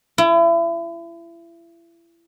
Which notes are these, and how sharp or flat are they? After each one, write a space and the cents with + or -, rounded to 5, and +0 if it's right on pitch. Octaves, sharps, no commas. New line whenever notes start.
E4 +35